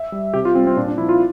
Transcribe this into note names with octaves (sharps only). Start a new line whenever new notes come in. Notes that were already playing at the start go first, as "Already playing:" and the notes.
Already playing: E5
G3
C3 G4
F4
G3 C4
C4
A#2 D4
D4
F3 E4
F4